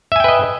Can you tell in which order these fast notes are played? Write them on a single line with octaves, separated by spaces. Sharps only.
E5 G#5 G5 B4 D#5